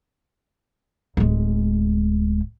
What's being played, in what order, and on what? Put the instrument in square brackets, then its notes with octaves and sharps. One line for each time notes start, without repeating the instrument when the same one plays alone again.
[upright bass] D1 G#3